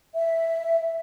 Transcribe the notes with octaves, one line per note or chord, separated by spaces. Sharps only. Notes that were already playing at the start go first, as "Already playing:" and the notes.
E5